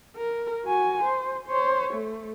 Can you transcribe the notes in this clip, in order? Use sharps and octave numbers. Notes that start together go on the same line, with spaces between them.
A#4
F#4 G#5
C5
C5 C#5
A3